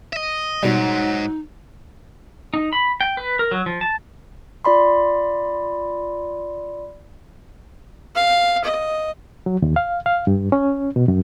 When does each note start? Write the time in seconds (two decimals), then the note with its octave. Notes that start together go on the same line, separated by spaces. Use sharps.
0.13 D#5 E5
0.63 G#2 B2 F#3 G3 D#4
2.54 D#4
2.73 B5
3.01 G5
3.17 B4
3.39 A#4
3.51 F#3
3.66 F3
3.81 A5
4.65 F4 D5 B5 C6
8.15 F5
8.64 D#5
9.46 F#3
9.62 D#2
9.76 F5
10.06 F5
10.27 G2
10.52 C#4
10.96 B2
11.08 F#2